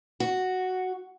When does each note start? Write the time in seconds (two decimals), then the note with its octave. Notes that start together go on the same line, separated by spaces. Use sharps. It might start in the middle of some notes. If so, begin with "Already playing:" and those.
0.20 F#4